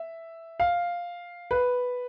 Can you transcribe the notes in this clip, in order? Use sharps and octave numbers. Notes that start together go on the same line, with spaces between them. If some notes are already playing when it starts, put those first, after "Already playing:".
Already playing: E5
F5
B4